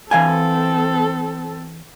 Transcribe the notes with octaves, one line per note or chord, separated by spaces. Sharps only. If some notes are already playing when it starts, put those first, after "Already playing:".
E3 C4 A4 F5 G#5